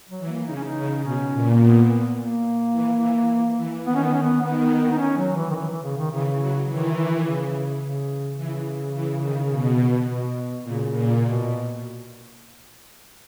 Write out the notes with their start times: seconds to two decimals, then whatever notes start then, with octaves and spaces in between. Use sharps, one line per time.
0.09 F#3
0.19 E3
0.29 A#3
0.47 C#3 D#4
0.56 C#4
0.64 D#4
0.75 C#3
1.03 B2 C#4
1.31 A#2
1.50 A#3
1.60 B3
2.16 A#3
2.73 E3
3.01 E3
3.58 E3
3.86 D#3 B3
3.95 C#4
4.04 B3
4.14 C#4
4.22 B3
4.42 D#3 B3
4.91 D#4
4.98 C#4
5.17 F#3
5.36 E3
5.51 D#3
5.55 E3
5.69 E3
5.83 C#3
5.98 D#3
6.11 C#3 E3
6.40 F#3
6.67 D#3 E3
7.14 D#3
7.25 C#3
7.81 C#3
8.37 C#3 E3
8.94 E3
9.22 D#3
9.50 B2
10.07 B2
10.63 A#2 C#3
10.92 A#2
11.20 B2